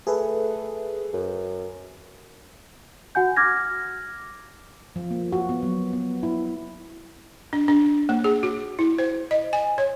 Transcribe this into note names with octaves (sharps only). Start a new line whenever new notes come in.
A3 G#4 A4 B4
F#2
F#4 F#5 G#5 G6
D6 F6 G#6 A#6
F3
A#3
F#4
B3
F#3
B3
E4
D4
D4
A#3
G#4
F#4
E4
C5
D#5
G#5
C#5